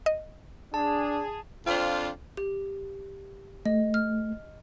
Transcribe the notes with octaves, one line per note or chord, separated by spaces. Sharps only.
D#5
D4 G#4 A5
F2 C4 D4 F4 F5
G4
A3 D#5
F6